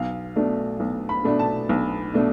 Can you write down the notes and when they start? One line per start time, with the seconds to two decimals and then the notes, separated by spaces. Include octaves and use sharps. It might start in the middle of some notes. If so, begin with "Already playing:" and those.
Already playing: B1 F5
0.36 B2 A3 D4
0.80 B1
1.09 B5
1.24 B2 A3 D4
1.39 A5
1.69 B1
2.14 B2 A3 D4